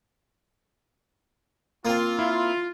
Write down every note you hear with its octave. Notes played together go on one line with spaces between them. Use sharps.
A#3 C4 F4
E4